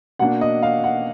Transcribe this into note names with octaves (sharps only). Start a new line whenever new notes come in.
B2 A#3 D4 F#5
D#5
F5
F#5